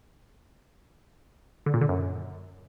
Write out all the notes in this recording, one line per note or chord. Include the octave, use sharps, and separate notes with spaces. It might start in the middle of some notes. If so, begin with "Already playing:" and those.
D3
A#2
D3
F#2